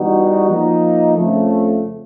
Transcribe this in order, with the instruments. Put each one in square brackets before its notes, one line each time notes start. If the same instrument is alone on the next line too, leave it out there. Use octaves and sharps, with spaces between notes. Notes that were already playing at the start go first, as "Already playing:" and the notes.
Already playing: [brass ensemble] E3 G3 B3 D#4 F#4
F3 A#3 D#4
F2 C#3 F3 A3